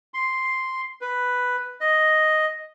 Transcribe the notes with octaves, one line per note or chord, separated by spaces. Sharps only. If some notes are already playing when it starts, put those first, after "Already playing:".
C6
B4
D#5